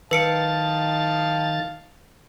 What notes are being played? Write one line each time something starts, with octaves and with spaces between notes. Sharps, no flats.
D#3 B4 F5 A5 A6 C#7 D7